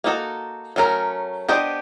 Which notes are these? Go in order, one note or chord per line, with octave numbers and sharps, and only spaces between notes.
A#3 D#4 F#4 A4
F#3 A3 C#4 F4 A#4
B3 D4 G4 C5 D#5